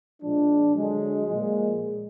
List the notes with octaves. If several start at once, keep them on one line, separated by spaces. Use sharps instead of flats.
A#2 F3 G#3 D4
D3 F#3 G#3
A#2 F3 G#3